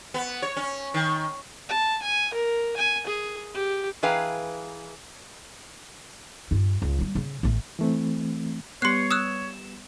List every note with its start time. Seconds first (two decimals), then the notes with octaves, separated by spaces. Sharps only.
0.14 B3
0.42 C#5
0.57 C#4
0.94 D#3
1.69 A5
2.02 G#5
2.34 A#4
2.77 G#5
3.07 G#4
3.54 G4
4.03 E3 G#4 B4 F5 G5 A#5
6.51 G2 F4
6.82 C#2
6.99 G3 A#3
7.15 C#3
7.43 A1 A3
7.79 E3 A3 C4
8.82 G3 B3 C#5 C6 F#6 C7 C#7
9.11 D#6 E6 F#6 E7